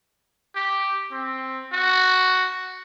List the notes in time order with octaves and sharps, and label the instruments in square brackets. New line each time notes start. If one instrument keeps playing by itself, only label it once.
[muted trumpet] G4
C4
F#4